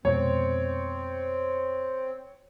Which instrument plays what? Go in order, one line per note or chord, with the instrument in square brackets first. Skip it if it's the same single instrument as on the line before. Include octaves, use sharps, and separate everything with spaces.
[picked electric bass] F1 B2 G#3 [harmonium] C4 [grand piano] C#5